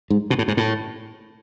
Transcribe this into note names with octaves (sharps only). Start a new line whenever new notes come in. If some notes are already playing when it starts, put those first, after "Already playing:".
G#2
B2
A2
G#2
A2